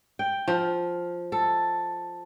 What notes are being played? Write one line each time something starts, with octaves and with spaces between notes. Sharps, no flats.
G5
F3
A4